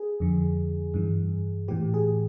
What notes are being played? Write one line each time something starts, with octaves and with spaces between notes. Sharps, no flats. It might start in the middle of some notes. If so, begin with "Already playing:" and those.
Already playing: G#4
F2 D3
G2 E3
A2 E3 G4
G#4